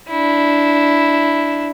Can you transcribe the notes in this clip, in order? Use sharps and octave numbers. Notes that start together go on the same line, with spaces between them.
D4 E4